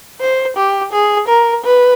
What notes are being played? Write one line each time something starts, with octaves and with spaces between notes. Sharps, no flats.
C5
G4
G#4
A#4
B4